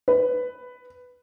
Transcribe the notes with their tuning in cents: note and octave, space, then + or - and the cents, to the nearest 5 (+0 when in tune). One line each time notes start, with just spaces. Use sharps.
B4 +10